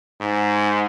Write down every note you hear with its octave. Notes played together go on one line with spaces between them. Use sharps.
G#2